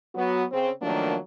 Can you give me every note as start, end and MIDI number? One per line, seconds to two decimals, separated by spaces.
0.15 0.44 54
0.15 0.44 59
0.15 0.44 66
0.51 0.70 49
0.51 0.70 60
0.82 1.18 51
0.82 1.18 53
0.82 1.18 54
0.82 1.18 57
0.82 1.18 58
0.82 1.18 62